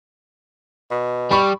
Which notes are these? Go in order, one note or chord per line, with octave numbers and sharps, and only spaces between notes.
B2
G3 B5 C#6